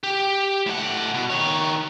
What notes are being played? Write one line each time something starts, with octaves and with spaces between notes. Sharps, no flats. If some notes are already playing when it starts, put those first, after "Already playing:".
G4
A2 F#5
B2
D#3 C#5